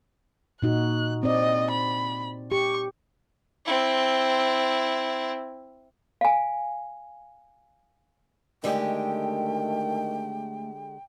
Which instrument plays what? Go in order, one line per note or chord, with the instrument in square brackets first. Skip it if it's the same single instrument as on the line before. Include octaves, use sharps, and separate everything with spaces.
[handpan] A#2 D#4 F#4 [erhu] F#6
[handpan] C4 D5 [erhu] D#5
[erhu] B5
[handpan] G4 [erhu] C#6
[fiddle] C4 E4
[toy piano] F5 G#5
[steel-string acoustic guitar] D3 G#3 G4 [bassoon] D#3 [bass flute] A3 [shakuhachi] G5